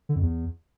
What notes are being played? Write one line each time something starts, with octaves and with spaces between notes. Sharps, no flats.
D3
F2
E2